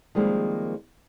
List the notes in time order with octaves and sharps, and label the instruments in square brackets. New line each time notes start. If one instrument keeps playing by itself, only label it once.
[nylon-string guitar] D#3 F3 G3 G#3 A#3 C4